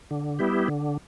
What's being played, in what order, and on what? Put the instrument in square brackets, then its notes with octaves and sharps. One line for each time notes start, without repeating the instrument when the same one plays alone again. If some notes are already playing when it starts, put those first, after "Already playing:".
[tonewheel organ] D3
G3 B3 E4 G4
D3